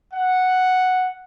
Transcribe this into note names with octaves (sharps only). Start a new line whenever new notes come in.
F#5